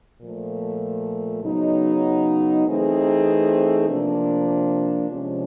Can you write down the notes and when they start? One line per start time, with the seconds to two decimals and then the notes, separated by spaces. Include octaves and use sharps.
0.21 A#2 F3 A3
1.43 C#3 F#3 B3 D#4
2.66 E3 A3 C4 D#4 G#4
3.88 C3 F3 A#3 D4
5.10 C3 F3 G#3 C#4